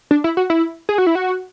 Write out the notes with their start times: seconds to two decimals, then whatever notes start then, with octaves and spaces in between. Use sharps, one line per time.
0.11 D4
0.24 E4
0.37 F#4
0.50 E4
0.89 G#4
0.98 F#4
1.07 E4
1.15 F#4